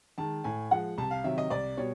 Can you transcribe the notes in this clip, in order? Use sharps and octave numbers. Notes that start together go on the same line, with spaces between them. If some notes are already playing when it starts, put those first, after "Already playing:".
D#3 G#3 A5
A2 G#5
F3 G#3 F#5
C2 A5
F5
C3 D#3 F#3 E5
D#5
C2 D5
B2 G3 C#5